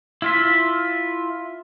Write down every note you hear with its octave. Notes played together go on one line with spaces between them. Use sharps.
E4 F4 E5